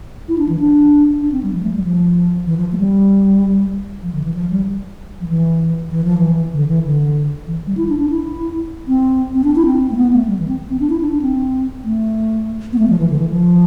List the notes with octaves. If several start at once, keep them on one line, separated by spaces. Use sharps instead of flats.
E4
D4
E3
D4
D4
C4
G3
F3
A3
G3
F3
E3
F3
A3
G3
F3
D3
E3
F3
G3
F3
E3
E3
F3
E3
D3
E3
D3
E3
G3
E4
D4
D4
E4
C4
C4
D4
E4
C4
A3
B3
A3
G3
E3
C4
C4
D4
E4
D4
D4
C4
A3
B3
A3
F3
E3
D3
E3
F3